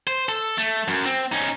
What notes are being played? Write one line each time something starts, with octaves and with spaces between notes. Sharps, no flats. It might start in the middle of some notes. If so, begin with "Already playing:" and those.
C5
A4
A3
F#2
C4
C#4 D#4